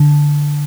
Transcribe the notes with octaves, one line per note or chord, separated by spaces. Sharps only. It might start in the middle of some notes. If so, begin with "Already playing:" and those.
Already playing: D3